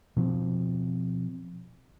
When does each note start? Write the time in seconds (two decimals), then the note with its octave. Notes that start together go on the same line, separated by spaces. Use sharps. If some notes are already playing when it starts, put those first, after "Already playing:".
0.16 B2 F3 C4